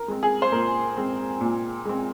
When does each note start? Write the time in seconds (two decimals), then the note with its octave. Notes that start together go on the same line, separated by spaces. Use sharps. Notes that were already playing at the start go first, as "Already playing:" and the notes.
Already playing: A#4
0.08 G#3 C4
0.23 G#4
0.42 C5
0.52 A#2 A#4
0.97 G#3 C4
1.41 A#2
1.85 G#3 C4